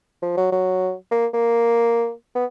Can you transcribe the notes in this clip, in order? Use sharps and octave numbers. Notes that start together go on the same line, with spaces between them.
F3
F#3
F#3
A#3
A#3
B3